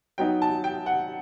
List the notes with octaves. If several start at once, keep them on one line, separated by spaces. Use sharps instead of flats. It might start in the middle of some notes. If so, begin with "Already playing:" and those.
F#3 B3 D#4 G5
A5
G5
F#5